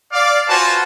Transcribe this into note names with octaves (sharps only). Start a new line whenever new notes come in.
D5 F5
F4 F#4 B4 C5 G#5 A5